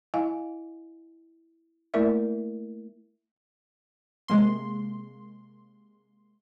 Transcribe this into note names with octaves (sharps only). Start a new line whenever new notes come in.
E4 D#5 F5 G#5
A3 A#3 E4 A#4 D5 E5
C3 G#3 A#3 C6